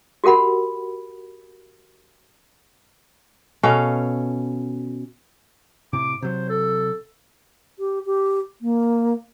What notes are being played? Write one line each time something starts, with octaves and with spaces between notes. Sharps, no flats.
F#4 G4 A#4 F#5 B5
B2 C#4 A4 F5
A2 C3 D6
C3 F#3 C5
A4
G4
G4
A#3